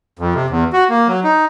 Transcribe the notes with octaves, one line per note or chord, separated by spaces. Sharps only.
F2
C3
E2
F#4
A#3
F#3
D#4